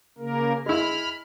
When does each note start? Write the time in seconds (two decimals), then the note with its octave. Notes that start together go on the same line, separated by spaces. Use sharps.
0.18 C#3 A#3 A#4
0.66 G#3 E4 B5 F6